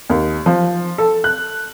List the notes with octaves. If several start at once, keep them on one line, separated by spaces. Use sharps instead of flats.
D#2
F3
A4
F#6